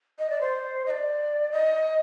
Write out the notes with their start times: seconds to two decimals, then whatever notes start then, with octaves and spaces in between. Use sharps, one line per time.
0.19 D#5
0.30 D5
0.41 C5
0.86 D#5
0.90 D5
1.52 D#5